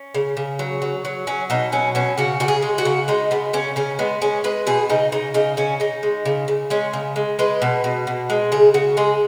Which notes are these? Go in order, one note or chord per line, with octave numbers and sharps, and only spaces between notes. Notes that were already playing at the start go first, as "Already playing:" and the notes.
Already playing: C#4
C#3
C#3
F#3
F#3
F#3
F#3 C#4
B2 D#4
F#3 C#4
B2 C#4
C#3 F#4
C#3 F#4
G#4
G#3
F#4
C#3
G#3 D#4
C#3 B3
C#3 C#4
C#3 C#4
G#3 B3
G#3 C#4
G#3 B4
B2 G#4
C#3 D#4
C#3 D#4
C#3 D#4
C#3 C#4
C#3 D#4
G#3
C#3
C#3
G#3 C#4
C#3
G#3
G#3 B4
B2
B2
B2
G#3
C#3 G#4
C#3 F#4
G#3 G#4